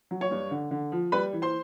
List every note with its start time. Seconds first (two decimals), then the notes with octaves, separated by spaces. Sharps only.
0.11 F#3
0.21 C#5 C#6
0.31 G2
0.51 D3
0.71 D3
0.92 F3
1.12 G3 B4 B5
1.33 E3
1.42 C5 C6